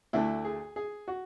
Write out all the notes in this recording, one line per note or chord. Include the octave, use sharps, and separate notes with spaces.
D2 D3 A3 E4
G#4
G#4
F#4